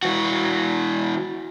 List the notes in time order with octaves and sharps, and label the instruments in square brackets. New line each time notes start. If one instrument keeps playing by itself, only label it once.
[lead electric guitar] E3 F#4